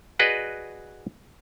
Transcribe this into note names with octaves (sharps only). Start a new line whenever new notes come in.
F#4 G#4 B4 D5 D#5